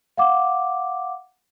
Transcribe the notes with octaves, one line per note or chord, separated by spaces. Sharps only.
F5 F#5 D6